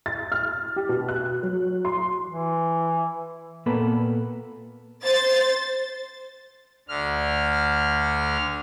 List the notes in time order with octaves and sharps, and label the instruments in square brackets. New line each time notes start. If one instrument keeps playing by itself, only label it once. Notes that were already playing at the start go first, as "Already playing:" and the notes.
[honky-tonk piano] A6
F6
G4
B2
F#6
F#3
C6
[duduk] E3
[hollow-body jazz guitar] A#2 A#3 B3 A4 B5
[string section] C5 A6
[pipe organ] D2 D3 F6